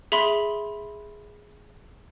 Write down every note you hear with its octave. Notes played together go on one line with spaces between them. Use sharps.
G#4 E5 B5 C6